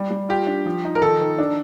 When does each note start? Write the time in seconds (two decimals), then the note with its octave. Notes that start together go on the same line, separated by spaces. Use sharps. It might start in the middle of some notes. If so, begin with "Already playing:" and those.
Already playing: G3
0.11 G3
0.29 F4 G4
0.47 D4
0.66 F3
0.85 D#4
0.95 A#4
1.02 D#3 A4
1.21 D#3
1.38 D4